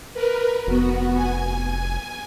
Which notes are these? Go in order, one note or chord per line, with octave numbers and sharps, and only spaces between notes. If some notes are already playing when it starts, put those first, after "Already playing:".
A#4 B4
F1 B3 F#4
G#5